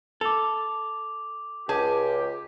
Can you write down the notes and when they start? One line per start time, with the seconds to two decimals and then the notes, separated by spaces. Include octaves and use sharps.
0.21 A4 D6 F7
1.69 C#2 G4 G#4 A5